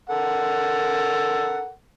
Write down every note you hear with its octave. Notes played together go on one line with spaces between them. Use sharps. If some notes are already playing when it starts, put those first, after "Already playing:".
A4 A#4 F#5